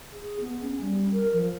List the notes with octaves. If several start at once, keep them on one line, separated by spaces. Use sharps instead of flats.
G#4
B3
C#4
G3
A#4
F3